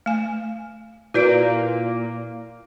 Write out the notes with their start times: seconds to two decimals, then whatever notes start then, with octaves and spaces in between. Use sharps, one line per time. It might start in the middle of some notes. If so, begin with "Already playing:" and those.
0.06 A3 G#5
1.14 A#2 A#3 E4 F#4 B4 D5 D7